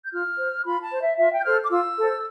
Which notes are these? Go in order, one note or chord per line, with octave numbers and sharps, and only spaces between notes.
G6
F4 F6
C5
F4 B5
A5
C5
E5
F4 E5
G5
G6
A4 C5 F6
D6
F4 E6
A4 C5